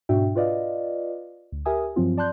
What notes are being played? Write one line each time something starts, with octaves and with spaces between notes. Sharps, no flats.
G#2 B2 D4 F#4 E5 G5
F4 B4 D5 D#5 F5
D2
G4 A#4 E5 G#5 D#6
G2 F3 F#3 C4 F4
D5 A5 C6 F#6 G6